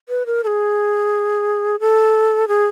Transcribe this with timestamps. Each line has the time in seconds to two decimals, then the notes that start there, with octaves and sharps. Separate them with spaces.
0.09 B4
0.26 A#4
0.44 A4
0.47 G#4
1.80 A4
2.48 G#4